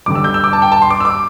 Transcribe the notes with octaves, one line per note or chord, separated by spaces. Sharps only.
G1 G2 D3 G3 D6
E6
G6
E6
D6
A5
G5
A5
C6
D6
E6
D6